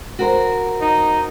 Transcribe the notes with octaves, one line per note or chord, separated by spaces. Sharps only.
F#4 A#4 C5
D#4